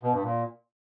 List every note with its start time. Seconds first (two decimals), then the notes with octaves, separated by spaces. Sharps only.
0.03 B2
0.13 G2
0.23 A#2